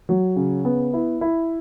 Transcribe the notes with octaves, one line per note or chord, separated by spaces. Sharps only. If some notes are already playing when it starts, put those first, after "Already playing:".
F#3
C#3
B3
E4
E4